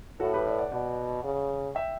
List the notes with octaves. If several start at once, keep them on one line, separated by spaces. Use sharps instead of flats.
A2 F#4 A4
G4 B4
B4 D5
D5 F#5
B2 D5 F#5
C#3
E5 G5